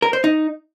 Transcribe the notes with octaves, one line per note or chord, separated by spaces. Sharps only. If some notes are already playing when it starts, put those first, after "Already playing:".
A#4
C5
D#4